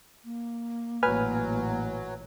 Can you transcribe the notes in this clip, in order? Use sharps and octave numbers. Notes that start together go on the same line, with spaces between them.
A#3
A1 A#2 F#3 B4 G#5 F6